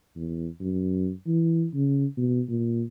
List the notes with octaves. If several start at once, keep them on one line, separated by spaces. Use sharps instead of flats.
E2
F#2
E3
C#3
B2
A#2